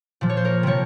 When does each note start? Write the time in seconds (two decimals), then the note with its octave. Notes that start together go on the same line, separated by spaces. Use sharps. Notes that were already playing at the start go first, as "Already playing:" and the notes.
0.21 A#2 F3
0.30 C#5
0.37 C5
0.45 A#4 C#5
0.63 C3 F3 A#4 C#5